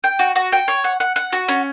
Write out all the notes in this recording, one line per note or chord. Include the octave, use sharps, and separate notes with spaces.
G5
F#4
F#4
G5
C#5
F#5
F#5
F#5
F#4
C#4